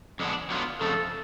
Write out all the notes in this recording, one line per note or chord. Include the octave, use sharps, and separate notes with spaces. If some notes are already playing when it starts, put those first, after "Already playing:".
F2 D3 G#3 B3 D4
D3 F#3 B3 F4
F2 C#3 F3 A3 A4